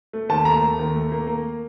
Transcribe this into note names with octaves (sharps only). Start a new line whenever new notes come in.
A3
D#2 A5
A3 A#5
A3
D#2
A3
A#3
A#3